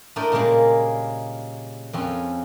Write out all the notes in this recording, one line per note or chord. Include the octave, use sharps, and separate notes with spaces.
A2 A3 D4 A#4 D#5 G5
A#2 C#3 G3 G#3 A#3
F2 C4 C#4